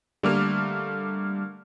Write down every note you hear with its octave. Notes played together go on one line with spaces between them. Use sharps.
D3 G3 A3 A#3 D6 F6